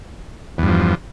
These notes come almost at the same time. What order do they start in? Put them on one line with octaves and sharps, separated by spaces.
E2 G2 F3